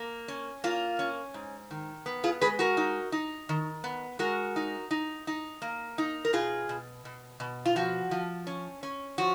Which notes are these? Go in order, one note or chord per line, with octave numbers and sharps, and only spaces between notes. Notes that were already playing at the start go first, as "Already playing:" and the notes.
Already playing: A#3
C#4
A#3 F4
C#4
G#2
D#3
B3
F4 G#4
G#3 G#4 B4
F#4 A#4
D#4
D#4
D#3
B3
G#3 F#4 A#4
D#4
D#4
D#4
A#3
D#4
A#4
B2 F4 G#4
B2
B2
B2
F4
F3 F#4
F3
C#4
C#4
F3 F#4